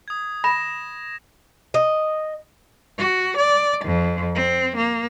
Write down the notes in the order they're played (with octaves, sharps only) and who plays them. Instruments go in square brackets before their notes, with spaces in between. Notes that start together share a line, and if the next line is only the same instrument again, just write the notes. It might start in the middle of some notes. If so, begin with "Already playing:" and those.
[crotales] D#6 G#6
[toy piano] B5 [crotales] A#6 E7
[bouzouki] D#5
[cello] F#4
D5
F2
C4
A#3